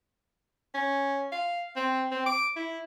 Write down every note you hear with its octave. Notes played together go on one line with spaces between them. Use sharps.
C#4
F5
C4
C4
D6
E4